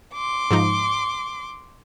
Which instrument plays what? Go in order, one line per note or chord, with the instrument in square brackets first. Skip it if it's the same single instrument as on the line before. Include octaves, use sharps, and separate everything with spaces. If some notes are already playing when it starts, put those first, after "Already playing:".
[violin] C6 D6
[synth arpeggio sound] G#2 F3 D#4